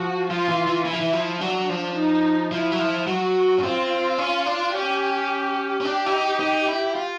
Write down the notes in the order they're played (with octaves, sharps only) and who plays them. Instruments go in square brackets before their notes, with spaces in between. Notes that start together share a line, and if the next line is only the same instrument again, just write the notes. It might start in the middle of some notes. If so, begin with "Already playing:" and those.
Already playing: [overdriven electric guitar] F3 [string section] F#4
[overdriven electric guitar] F3 [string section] F4
[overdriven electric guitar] E3
E3
[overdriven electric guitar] E3 [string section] E4
[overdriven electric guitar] F3
E3
F3
[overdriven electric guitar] F#3 [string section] D4
[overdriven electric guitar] F3
[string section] D#4
[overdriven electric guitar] F3 [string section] E4
[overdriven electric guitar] F#3
F3
[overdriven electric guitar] F#3 [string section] F#4
[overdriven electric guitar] C#4
[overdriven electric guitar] C4 [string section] F4
[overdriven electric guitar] C#4
D4
[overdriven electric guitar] C#4 [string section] G4
[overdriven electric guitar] C#4
[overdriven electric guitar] D4 [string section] G4
[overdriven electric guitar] E4
D#4
D#4
E4
F4